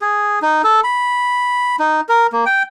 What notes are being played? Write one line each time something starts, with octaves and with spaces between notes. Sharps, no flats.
G#4
D#4
A4
B5
D#4
A#4
A#3
G5